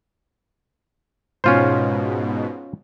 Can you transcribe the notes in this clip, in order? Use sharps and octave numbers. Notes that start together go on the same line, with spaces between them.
G#2 B2 C#4 F4 C5